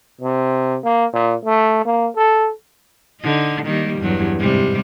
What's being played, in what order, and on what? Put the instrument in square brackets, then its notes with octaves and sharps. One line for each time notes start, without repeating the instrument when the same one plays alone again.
[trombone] C3
A#3
A#2
A3
A#3
A4
[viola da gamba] D3 D#4
D#3 G3 A#3
E2 G2 F#3
G#2 C3 G3